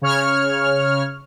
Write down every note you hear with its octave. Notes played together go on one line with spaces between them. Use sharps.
C#3 C#5 F6